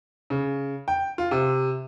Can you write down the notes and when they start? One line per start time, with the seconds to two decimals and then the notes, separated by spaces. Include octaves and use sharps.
0.30 C#3
0.88 G5
1.18 F4
1.31 C3